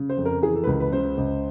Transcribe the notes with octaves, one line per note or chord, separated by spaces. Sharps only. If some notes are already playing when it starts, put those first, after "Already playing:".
Already playing: C#3
C5
F2
A#4
E3 G#4
A4
B4
C#2 A#4
B4
C#3 C5
C#2